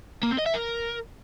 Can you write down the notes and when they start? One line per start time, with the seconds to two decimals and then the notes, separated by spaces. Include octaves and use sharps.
0.23 A#3
0.31 C4
0.38 D#5
0.46 E5
0.54 A#4